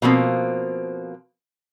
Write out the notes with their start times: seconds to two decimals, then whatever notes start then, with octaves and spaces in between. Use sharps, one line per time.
0.02 B2 F3 A#3 C4